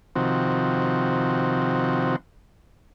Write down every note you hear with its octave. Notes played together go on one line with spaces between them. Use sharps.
C3 D#3 F3 C4 F#4